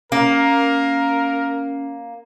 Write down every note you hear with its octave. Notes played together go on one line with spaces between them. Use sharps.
A#3 C#4 A#4